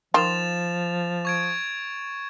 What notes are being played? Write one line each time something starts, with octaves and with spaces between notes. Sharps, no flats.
D#3 F3 F4 A6 E7 F7
C#6 G#6 D7